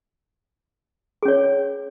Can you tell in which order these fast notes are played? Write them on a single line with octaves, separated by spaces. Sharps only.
G#4 C#4 C#5